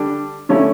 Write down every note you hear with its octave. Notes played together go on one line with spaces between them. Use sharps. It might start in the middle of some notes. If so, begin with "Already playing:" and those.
Already playing: D3 G3 D4
D3 A3 C#4 E4